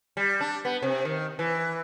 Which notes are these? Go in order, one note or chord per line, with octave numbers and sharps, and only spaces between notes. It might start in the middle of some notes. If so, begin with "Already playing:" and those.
G3
D4
B3
C3
D#3
E3